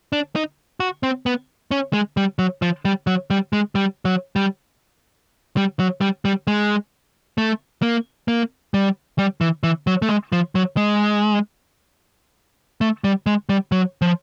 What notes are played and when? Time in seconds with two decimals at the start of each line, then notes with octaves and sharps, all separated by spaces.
0.13 D4
0.36 D#4
0.80 F#4
1.03 C4
1.26 B3
1.71 C#4
1.93 G#3
2.17 G3
2.39 F#3
2.62 F3
2.85 G3
3.07 F#3
3.30 G3
3.53 G#3
3.75 G3
4.05 F#3
4.36 G3
5.57 G3
5.79 F#3
6.01 G3
6.25 G3
6.47 G#3
7.38 A3
7.82 A#3
8.28 A#3
8.74 G3
9.18 G3
9.41 E3
9.63 E3
9.87 F#3
10.02 A3
10.09 G#3
10.32 F3
10.55 F#3
10.77 G#3
12.81 A3
13.04 G3
13.26 G#3
13.49 G3
13.72 F#3
14.02 F3